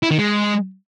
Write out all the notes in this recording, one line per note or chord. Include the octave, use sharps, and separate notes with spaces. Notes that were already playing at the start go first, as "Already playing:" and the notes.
E4
D#3
G#3